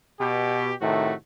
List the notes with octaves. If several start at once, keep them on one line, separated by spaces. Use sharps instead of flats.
B2 G4
A2 C3 D#3 A3 F#4